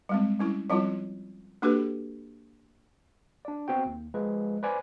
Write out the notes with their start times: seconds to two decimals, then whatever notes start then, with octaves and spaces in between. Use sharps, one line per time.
0.09 G3 G#3 C4
0.39 G3 C#4 E4
0.70 F3 G3 C4 E4 F4
1.62 A#3 D4 F#4 G4 A4 B4
3.45 D4 D5
3.68 B3 C4 F#4 G5
3.86 D#2
4.14 F3 G#3 B4
4.63 B4 C5 D5 G#5 B5